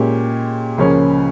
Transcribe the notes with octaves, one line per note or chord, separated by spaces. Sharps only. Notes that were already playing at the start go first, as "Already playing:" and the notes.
Already playing: A#2 G#3 C#4 G4
C#2 C#3 F3 A#3 C#4